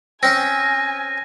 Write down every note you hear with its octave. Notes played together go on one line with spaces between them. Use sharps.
C4 C#4 G#5 A#6